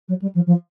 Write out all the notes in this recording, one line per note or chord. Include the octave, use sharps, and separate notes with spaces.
F#3
G3
F3
F3